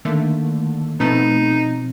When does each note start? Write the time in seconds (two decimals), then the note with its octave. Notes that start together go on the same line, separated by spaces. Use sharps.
0.05 D3 D#3 A3 A#3
1.00 B2 F3 A3 B3 C4 D#4